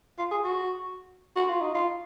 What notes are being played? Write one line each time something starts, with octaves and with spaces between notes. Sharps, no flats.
F4
G#4
F#4
F#4
F4
D#4
F4